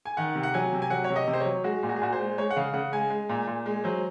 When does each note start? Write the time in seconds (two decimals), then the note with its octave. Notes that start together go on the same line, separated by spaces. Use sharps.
0.05 G#5
0.17 D#3 F#5
0.35 C3
0.43 F#5
0.54 F#3 G#5
0.73 C3
0.82 G#5
0.90 F#3 F#5
1.04 C#5
1.10 C3
1.16 D#5
1.28 C3
1.33 C5
1.40 C#5
1.46 F#3
1.64 G#3 F#4
1.83 A#2
1.89 F#4
1.96 G#4
2.02 A#2 F#4
2.13 C5
2.19 G#3
2.38 G#3 C#5
2.50 F#5
2.56 C#3 F5
2.74 C#3 F#5
2.92 G#3 G#5
3.10 G#3
3.29 A#2
3.47 A#2
3.66 G#3
3.84 F#3 C5